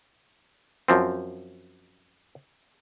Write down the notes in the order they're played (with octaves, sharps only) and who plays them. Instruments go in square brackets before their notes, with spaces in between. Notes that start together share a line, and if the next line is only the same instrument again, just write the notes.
[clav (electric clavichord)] F#2 F3 C4